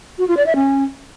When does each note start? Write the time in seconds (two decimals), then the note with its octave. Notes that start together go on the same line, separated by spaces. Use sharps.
0.18 F#4
0.28 F4
0.37 D5
0.46 E5
0.56 C#4